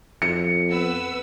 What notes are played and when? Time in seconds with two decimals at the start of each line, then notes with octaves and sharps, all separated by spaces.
0.22 F2 C#7
0.70 B3 B4 E6